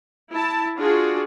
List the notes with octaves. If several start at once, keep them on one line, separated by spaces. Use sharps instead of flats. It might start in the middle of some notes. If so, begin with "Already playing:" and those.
E4 A5
D4 F4 F#4 G#4